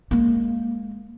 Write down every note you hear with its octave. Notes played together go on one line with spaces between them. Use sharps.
G#3 A#3